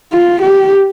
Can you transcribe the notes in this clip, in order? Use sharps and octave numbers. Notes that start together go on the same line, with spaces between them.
F4
G4